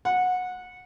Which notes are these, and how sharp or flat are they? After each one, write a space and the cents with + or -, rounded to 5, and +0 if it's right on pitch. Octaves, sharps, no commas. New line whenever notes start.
F#5 -20